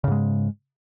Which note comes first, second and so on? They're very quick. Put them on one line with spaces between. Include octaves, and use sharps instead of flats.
C#3 G#2 G#3